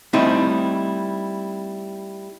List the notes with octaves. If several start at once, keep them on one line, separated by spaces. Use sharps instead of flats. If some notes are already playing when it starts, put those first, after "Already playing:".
G3 A3 C4 D#4 E4